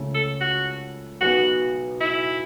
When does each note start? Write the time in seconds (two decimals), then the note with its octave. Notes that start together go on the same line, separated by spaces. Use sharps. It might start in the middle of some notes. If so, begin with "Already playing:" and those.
Already playing: C#2 C#3 A3 C#4
0.14 A4
0.41 F#4
1.21 B1 B2 B3 F#4
2.01 E4